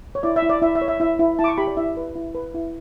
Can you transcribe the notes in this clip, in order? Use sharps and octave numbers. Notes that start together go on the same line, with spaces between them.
C#5
E4 D5
E5
E4
D5
E4 E5
E5
C#5
E5
E4 E5
E4
E4 A5
D6
C#6
G4 B5
D5
E4 E5
B4
E4
B4
E4